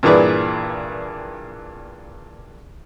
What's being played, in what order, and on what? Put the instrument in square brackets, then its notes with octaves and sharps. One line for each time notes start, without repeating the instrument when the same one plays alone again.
[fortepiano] G2 A#2 E3 G#4 B4 D5